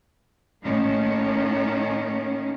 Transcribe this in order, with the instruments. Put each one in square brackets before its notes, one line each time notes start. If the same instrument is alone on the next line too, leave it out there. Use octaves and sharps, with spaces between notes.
[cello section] A2 D#3 A#3 C#4